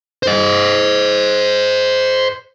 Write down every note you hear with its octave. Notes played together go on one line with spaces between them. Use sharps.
C5 D#5